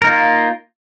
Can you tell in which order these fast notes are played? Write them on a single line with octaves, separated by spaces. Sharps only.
A#4 D#4 A#3 F4